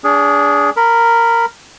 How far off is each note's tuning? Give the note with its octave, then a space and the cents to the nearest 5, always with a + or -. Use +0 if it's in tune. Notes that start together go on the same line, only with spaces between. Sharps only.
D4 -30 G#4 +0
A#4 -10 B5 +0